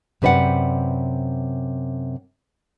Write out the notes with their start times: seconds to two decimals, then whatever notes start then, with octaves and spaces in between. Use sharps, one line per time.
0.22 F#2 C3 B4 D5 F#5